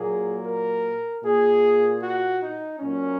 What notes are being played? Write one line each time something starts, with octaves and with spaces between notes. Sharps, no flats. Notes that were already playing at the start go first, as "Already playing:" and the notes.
Already playing: A#2 F#3 A#3 G#4
A#4
A#2 A#3 G#4
F#4
D#4
A#2 F#3 A#3 C#4